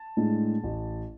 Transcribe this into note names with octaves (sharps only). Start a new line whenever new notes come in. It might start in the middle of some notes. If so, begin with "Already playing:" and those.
Already playing: A5
A2 G#3 D4
A1